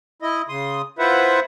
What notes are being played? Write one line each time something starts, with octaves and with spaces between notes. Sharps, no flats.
E4 D#5
C#3 C6 D#6
E4 F4 B4 C5 E5 F#5